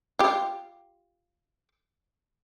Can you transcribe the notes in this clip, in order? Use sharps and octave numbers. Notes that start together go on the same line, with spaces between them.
F4 G4